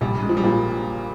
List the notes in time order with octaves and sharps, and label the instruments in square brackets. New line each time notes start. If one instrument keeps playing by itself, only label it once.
[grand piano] A#1 [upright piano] G3
[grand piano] G#3
[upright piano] F3
G3
[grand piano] A#2 [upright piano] F3